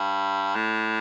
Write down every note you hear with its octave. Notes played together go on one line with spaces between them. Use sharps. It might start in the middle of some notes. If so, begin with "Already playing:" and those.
Already playing: G2
A2